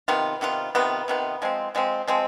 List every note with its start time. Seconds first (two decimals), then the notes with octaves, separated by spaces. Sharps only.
0.08 C3 D#3 B3 F4
0.41 C3 D#3 B3 F4
0.75 C3 D#3 B3 F4
1.08 C3 D#3 B3 F4
1.42 F3 G#3 C4
1.75 F3 G#3 C4
2.08 F3 G#3 C4